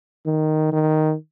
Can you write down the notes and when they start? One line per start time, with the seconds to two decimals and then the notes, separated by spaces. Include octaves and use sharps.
0.26 D#3
0.72 D#3